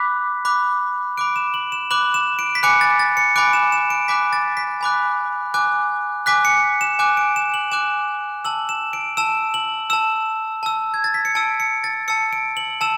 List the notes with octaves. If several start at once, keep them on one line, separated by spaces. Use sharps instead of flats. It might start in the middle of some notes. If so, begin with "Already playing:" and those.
Already playing: B5 D6 F#6 B6
B5 D6 F#6
B5 D6 F#6 D7
E7
F#7
E7
B5 D6 F#6 F#7
E7
D7
B6
G#5 B5 D6 F#6 C#7
A6
A6
C#7
G#5 B5 D6 F#6 D7
E7
E7
D7
G#5 B5 D6 F#6 B6
A6
B6
G#5 B5 D6 F#6
G#5 D6 F#6
G#5 D6 F#6 B6
C#7
E7
G#5 D6 F#6
D7
E7
F#7
G#5 D6 F#6 E7
A5 E6 F#7
E7
D7
A5 E6 E7
F#7
A5 E6 E7
A5 E6
G#6
A6
B6
C#7
A5 E6 D7
C#7
A6
A5 E6 C#7
D7
F#7
A5 E6 E7